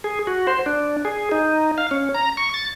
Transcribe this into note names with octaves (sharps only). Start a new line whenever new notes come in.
G#4
F#4
C5
D4
G#4
D#4
F5
C#4
A#5
C#6
A6